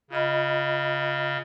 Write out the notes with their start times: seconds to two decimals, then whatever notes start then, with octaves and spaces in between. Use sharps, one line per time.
0.10 C#3 F4 D#5 B5